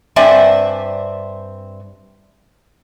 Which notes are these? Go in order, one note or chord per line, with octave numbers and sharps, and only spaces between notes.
G2 C4 D5 E5 G#5